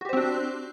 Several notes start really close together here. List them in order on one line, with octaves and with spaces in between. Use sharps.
F#4 G4 C5 C4 D4